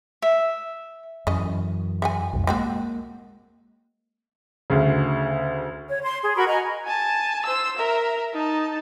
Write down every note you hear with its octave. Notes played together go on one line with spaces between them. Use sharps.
E5
F#2 E3 C#4 D#5
E5 F#5 G#5
B1 F2 G#2
F#3 G#3 A#3 C4 F#4
D2 C#3
C#5
C6
G#4
F#4 A#4 B5 C#6
D#5 F#5 G#5 A#5
G#5 A5
C5 E6
A#4 E5
D#4 A5